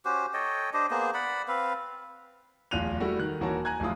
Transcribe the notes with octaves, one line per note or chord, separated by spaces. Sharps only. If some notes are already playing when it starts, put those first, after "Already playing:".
C#4 F#4 G4 C5
A4 C#5 D#5 G5
D4 G4 C5 D#5
A#3 B3 G#4 C5
D5 F#5 B5
C4 B4 F5
D1 E2 F4 F#6 D#7 F7
G3 A3 E4 F#4
D#3 F#6
D#1 E3 F#4 A#4 C#5 A5
G#5 A#5 F#6 G#6
D1 F2 E4 F4 D#6